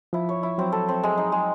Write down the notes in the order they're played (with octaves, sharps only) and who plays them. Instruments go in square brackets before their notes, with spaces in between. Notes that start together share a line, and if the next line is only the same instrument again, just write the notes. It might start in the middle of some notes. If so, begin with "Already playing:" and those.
[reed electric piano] F3 [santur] E4
[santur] C#5
E4
[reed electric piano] F#3 [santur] C4
[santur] A4
C4
G#3
D#4
G#3